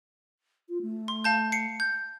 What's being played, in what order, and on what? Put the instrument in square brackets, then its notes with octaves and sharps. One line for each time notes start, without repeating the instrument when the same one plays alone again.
[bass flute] F4
A3
[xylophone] C6
F5 A5 G6
C7 C#7
G6